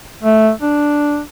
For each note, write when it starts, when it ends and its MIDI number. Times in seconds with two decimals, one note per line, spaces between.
0.23 0.50 57
0.62 1.21 62